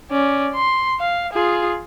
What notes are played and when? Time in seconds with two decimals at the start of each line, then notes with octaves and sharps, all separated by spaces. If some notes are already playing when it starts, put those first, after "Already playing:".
0.11 C#4 D5
0.55 C6
1.00 F5
1.33 F4 G#4